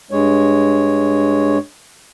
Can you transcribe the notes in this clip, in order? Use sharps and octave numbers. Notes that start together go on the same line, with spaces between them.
G2 G#3 C#5